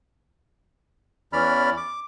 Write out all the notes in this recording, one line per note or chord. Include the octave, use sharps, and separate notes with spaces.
E2 E3 C#4 D5 B5 F6
D6